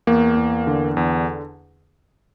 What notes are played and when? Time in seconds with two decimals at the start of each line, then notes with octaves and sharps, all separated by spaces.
0.07 E2 A#3
0.37 E2
0.67 D3
0.97 E2